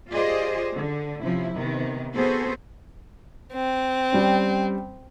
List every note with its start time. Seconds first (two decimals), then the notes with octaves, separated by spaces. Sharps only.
0.12 F4 G4 G#4 C5 D5 D#5
0.73 D3
1.21 C3 F3 C#4 E4
1.55 C3 D#3 B3
2.15 B3 C4 F#4 G#4 A4 C5
3.52 C4
4.12 G3 C#4